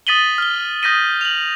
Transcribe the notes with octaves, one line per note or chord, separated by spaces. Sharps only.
D#6 A6 B6 D#7 F#7 G7
F6 G7
D#6 G6 A#6 B6 D#7
F7 F#7